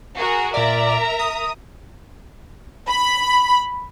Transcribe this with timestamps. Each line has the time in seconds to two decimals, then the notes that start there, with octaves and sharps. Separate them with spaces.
0.15 F#4 G#4 A#4
0.54 A#2 A#4 D5 E5 A#5
1.19 D#6
2.88 B5